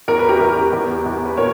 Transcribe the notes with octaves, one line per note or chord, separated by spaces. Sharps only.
E2 A#4
B4
G4 A#4
E2
E2
E2
B4
A#2 A#4 C#5